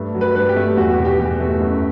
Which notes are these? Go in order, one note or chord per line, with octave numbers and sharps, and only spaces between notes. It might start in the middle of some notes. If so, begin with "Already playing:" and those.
Already playing: G2 A3
F#3
B4
G2 B4
G4
A3
E2 F#4
G4
B2
G4
E2 G4
A3
F#2